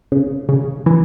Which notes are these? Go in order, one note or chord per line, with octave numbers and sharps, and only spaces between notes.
C#3
C#3
E3